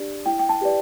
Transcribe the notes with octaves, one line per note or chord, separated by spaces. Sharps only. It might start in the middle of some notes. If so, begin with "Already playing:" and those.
Already playing: D4 G4 D5
E4 G5
G5
A5
G4 B4 D5